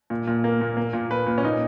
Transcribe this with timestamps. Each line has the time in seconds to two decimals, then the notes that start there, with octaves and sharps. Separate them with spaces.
0.10 A#2
0.27 A#2
0.44 A#3
0.61 A#2
0.77 A#3
0.93 A#2
1.11 A#2 B4
1.27 A#2
1.38 C#4
1.43 A#2 D#4